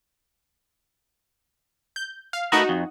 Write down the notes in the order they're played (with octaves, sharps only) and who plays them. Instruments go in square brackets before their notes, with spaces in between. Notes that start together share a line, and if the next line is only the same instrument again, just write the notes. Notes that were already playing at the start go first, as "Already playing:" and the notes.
[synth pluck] G6
F5
[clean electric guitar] A3 A#4 B4 [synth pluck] D#4 F#4 D#6
[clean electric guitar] F2